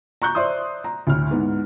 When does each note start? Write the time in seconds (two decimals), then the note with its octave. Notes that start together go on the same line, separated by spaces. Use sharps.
0.22 A#5 C#6 F#6 G6
0.35 C5 D5 E5 C6 D#6
0.84 A#5
1.07 D2 A2 F6
1.31 G#2 B3 E4